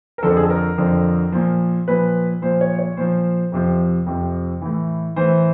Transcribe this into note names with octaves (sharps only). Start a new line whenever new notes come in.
A#4
F2 D3 F3 A4
G#4
A4
A#4
F2 D3 F3
A#2 F3
A#2 F3 B4
A#2 F3 C5
C#5
C#5
A#2 F3 C5
F2 C3 F3
F2 C3 F3
A2 E3
A2 E3 C5